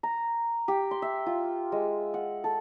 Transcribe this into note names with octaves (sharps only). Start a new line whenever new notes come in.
A#5
G4
C6
E5
F4
G#3
F#5
A4